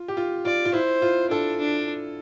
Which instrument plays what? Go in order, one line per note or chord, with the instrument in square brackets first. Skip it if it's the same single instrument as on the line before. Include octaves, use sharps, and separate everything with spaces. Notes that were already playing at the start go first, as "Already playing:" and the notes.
Already playing: [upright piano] F4
G4
F4
[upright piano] F4 [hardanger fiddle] D5
[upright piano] F4
[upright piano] E4 [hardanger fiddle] C5
[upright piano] F4
[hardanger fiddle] D4 [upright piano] A4
[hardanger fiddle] D4